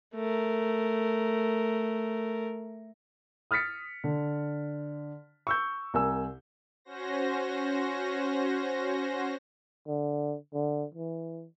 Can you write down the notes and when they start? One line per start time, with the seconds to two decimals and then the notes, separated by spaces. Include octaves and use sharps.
0.15 A3 A#4
3.51 D#6 F6 A6 B6 C#7
4.04 D3
5.47 C#6 E6 G6
5.94 C2 A#4 G#5 E6
6.85 C#4 F#4 C5 A#6
9.87 D3
10.54 D3
10.94 E3